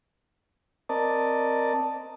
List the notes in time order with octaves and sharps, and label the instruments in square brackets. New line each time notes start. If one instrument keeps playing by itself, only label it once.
[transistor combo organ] C4 A#4 D5 D#5 A5